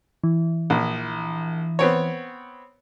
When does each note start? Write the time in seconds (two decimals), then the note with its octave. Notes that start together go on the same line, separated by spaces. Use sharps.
0.24 E3
0.70 A#1
1.79 B3 C4 C#5